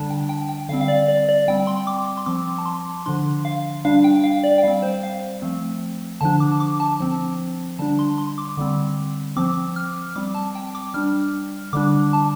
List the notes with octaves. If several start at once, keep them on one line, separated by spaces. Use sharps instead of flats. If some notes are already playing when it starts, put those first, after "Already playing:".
Already playing: D3 G3 D4 A5
G5
G5
G5
D3 G3 C4 F5
F5
D5
D5
D5
G3 C4 G5
C6
D6
C6
F3 C4 D6
A5
C6
D3 F3 D4 C6
F5
G3 D4 F5
G5
F5
D5
G5
G3 C4 F5
C5
F5
F3 A3 C4
D3 F3 D4 A5
D6
D6
A5
F3 C4
D3 G3 D4 A5
C6
C6
D6
D3 G3 C4
F3 C4 D6
F6
G3 C4 D6
A5
G5
D6
G3 D4 F6
D3 G3 D4 D6
A5